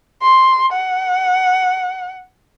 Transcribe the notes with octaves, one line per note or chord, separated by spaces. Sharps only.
C6
F#5